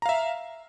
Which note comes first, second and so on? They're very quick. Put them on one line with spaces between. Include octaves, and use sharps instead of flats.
A#5 F5 E5